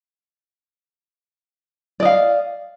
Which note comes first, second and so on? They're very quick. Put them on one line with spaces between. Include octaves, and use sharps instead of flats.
D5 D#5 F5